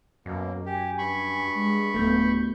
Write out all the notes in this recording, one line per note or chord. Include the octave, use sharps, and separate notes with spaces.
F#2 B2 A#3
G4 G#5
G2 B5 C#6
G#3
D1 A3 B3 G6